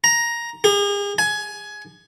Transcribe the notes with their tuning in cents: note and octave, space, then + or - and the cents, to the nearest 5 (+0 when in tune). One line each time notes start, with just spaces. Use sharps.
A#5 +10
G#4 -40
G#5 +20